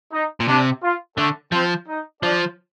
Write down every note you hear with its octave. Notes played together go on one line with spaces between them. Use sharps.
D#4
A#2
C3 D4
F4
D3 A3 A4
F3 C4 C5
D#4 D#5
F3 D4 D5